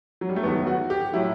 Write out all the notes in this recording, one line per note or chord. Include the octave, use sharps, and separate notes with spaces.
F#3
G3
A3
E2 D#3 F#3 B3
F#4
G4
A2 F#3 E4